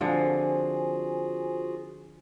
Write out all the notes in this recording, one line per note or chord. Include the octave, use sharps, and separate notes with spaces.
D3 F3 C4 F4 F#4 G#4 C5 G#5